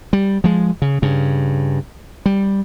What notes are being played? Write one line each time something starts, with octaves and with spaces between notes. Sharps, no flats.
G3
F3 G#3
C#3
G2 C#3
G3